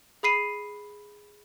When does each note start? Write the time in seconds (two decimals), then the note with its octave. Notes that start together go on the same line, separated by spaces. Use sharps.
0.23 G#4 B5 C7 D#7